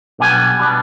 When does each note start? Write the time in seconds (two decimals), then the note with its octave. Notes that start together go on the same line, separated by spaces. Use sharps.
0.19 B1 B2 G3 B3 D4 G#5
0.59 B2 G3 B3 D4